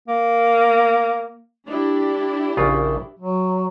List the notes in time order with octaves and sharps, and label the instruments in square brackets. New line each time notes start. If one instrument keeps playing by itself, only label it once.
[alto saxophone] A#3
[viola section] D4 E4 G4
[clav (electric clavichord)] A#1 C#3 F4
[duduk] F#3